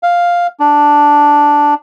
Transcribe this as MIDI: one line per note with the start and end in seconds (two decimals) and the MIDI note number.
0.03 0.47 77
0.60 1.74 62